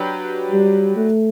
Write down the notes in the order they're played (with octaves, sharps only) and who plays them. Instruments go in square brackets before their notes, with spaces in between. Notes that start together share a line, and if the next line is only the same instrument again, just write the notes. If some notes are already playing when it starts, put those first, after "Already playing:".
Already playing: [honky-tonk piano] F#3 D4 G4 B4
[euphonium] G3
A3